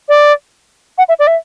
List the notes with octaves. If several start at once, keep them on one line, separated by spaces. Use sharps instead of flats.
D5
F#5
E5
D5
E5